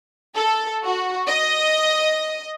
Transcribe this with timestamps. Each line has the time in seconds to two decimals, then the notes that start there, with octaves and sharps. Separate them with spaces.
0.35 A4
0.85 F#4
1.27 D#5